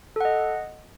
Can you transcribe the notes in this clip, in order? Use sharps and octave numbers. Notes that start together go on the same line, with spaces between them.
A4 D#5 F#5